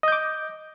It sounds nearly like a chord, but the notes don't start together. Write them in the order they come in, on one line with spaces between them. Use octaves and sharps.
D#5 G6 D6